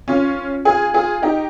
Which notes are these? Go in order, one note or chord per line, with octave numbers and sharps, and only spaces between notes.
C#4 F4
F4 G#4
F4 G#4
D#4 G4